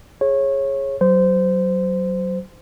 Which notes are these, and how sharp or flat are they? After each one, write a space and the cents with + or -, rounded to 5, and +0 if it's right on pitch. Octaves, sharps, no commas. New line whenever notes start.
G#4 +0 C#5 -20
F#3 +20 C5 -20